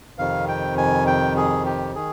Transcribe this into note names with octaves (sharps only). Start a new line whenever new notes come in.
F2 C3 D#3 F5
G5
G#5
G5
G#4
G4
D#3 G#4